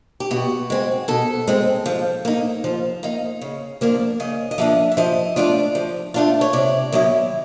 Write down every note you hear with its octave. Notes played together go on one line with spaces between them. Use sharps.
G4
B2 F#4
G#3 C4
B2 A4
G#3 C4
F3
A#3 D#4
F3
A#3 D#4
C#3
F3 A#3 D4
C#3 D#5
D#5
F3 A#3 D4 E5
E5
F3 D#5
A3 D4 F4 D5
F3
A3 D4 F4
C#5
C3 D5
D#3 F#3 B3 E4